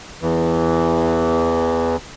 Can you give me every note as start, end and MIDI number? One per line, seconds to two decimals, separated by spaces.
0.22 1.96 40
0.22 1.96 52